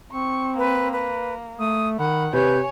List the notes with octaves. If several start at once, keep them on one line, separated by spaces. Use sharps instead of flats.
C4 C#6
A#3 B4
B4
A3 D#6
D#3 F#5 B5
C3 B4 C#5 G#5 G6